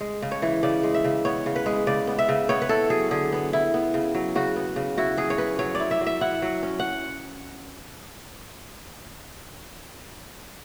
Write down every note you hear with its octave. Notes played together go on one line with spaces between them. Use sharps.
G#3
C#3
C#5
E3
C#3 D5
G#3
E5
C#3
B3 C#5
C#3
B4
G#3
C#3 D5
B3
E5
C#3
B3 C#5
B4
E4 A4
F#3 G#4
D3 G#4
B3
E4
B3
C#3
F#3
C#3 F#4
B3
C#3
E4 F#4
F#3 G#4
C#5
C#4 B4
F#3 C#5
D5
E4
E5
F#3
E5
E4 F#5
F#3
C#4
F#5